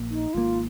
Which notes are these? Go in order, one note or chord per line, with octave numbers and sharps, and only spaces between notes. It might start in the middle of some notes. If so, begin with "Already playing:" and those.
Already playing: A#1 A#3
D#4
G#1 G#2 D#3 A#3 F4